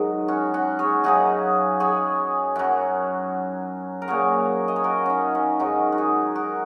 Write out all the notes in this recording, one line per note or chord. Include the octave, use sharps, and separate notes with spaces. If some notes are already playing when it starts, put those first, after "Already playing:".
Already playing: G#2 D#3 F#3 D#4
C#4 F#4
C#4 F#4
G#4 C#5
F#2 C#3 F#3 D#4 G#4
G#4 C#5
F#2 F#3
A#4
A#2 F#3 G#4 C#5
D#5
C#5
F#4 A#4
C#4 D#4
C#4
G#2 D#3 F#3 D#4
F#4
D#4 G#4
F#4 A#4